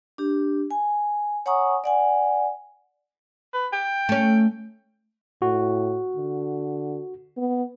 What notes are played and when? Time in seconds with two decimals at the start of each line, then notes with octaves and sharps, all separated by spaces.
0.18 D4 G4
0.71 G#5
1.46 C#5 F#5 G#5 A#5 C#6 D#6
1.84 D5 F#5 G#5
3.54 B4
3.73 G5
4.09 A3 C#4
5.42 A2 F#4
6.17 D3
7.37 B3